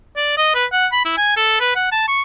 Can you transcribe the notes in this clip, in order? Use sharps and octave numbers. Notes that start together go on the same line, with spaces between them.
D5
D#5
B4
F#5
B5
E4
G#5
A4
B4
F#5
A5
C#6